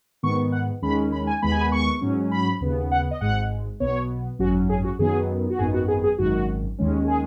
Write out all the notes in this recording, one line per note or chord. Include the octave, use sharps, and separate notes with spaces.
G#2 D#3 B3 C#6
F#5
D#2 D#3 G#3 C#4 B5
B5
G#5
D#2 D#3 G#3 B3 B5
G#5
B5
C#6
G#2 F#3 C#4
B5
D#2 C#3 B3
F#5
D#5
G#1 G#2 G#3 F#5
B1 B2 B3 C#5
G#1 F#2 F#3 C#4 F#4
G#4
F#4
F#2 D#3 F#3 B3 G#4
F#4
G#1 F#2 D#3 B3 G#4
F#4
G#4
G#4
G#1 F#2 D#3 F#4
D#2 D#3 G#3 C#4
G#4